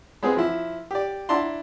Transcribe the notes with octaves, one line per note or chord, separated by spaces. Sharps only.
G#3 B3 C4 G#4
F3 E4
G4 D5
D4 E4 D5 A5 A#5 C6